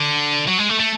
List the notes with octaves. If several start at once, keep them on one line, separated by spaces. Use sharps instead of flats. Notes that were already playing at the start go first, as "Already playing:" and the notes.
Already playing: D3
F#3
G#3
A3
A3